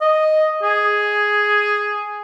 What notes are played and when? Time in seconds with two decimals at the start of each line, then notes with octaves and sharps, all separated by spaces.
0.01 D#5
0.63 G#4